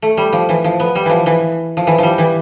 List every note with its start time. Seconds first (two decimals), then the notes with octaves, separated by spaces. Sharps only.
0.02 A3
0.17 G3
0.33 F3
0.49 E3
0.64 F3
0.80 B3
0.95 G3
1.05 E3 F3
1.26 E3
1.77 F3
1.87 E3
1.98 F3 G3
2.18 E3